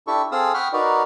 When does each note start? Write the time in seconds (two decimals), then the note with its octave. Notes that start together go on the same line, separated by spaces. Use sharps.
0.07 D4 E4 G4 A4 C#6
0.32 C4 G#4 A4 F5 D#6 E6
0.54 F#5 G5 B5 C#6 D#6 F6
0.73 D#4 F#4 A#4 B4 D5